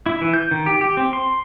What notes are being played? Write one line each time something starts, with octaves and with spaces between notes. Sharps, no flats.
E4
E3
G6
D#3
G4
G4
C4
C6